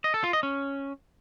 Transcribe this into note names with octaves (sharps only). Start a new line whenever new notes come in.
D#5
A4
F4
D#5
C#4